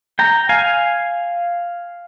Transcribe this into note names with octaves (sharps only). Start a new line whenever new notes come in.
G5 A#5
F5 G#5